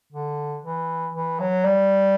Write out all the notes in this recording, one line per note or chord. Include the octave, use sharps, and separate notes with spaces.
D3
E3
E3
F#3
G3